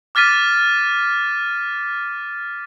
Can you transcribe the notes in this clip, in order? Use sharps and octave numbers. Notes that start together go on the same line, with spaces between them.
D6 F6 A6 B6 D#7